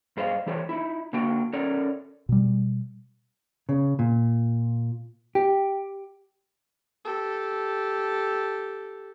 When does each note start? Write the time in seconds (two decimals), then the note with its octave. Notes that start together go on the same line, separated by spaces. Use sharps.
0.17 G2 G#4 C5 D#5 F5
0.46 E3 A3 G4 C5 C#5
0.69 D#4 E4
1.13 D3 A#3 F#4 G5
1.53 C#4 A4 A#4 C#5 D5
2.29 B2 G3
3.69 C#3
3.99 A#2
5.35 G4
7.05 G4 A4